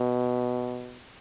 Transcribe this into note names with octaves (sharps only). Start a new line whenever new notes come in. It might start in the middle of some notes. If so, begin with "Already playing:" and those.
Already playing: B2